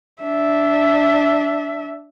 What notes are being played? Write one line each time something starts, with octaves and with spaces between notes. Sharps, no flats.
D4 E5